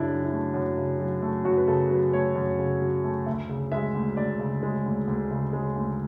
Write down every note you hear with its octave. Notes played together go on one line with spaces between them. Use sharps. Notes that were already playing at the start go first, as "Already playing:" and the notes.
Already playing: F#2 C#3 D4 E4
F#3
E4
A3
F#2
C#3
F#3
A3
F#2 F#4
B4
C#3 A4
F#3 B4
A3 C#5
F#2
C#3
F#3
A3
D2 E5
C#3
G#3 E5
D2
D2 D5
C#3
G#3
D2
D2
C#3
G#3
D2